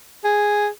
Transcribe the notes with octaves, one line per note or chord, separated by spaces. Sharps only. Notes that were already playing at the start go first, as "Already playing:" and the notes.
G#4